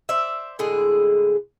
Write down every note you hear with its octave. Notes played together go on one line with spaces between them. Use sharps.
C5 D5 E5
A2 D3 G#3 G#4